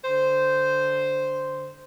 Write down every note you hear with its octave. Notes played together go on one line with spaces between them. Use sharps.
D3 C5